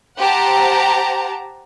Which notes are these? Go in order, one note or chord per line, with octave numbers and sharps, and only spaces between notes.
G4 C5 F#5 G5 A5 A#5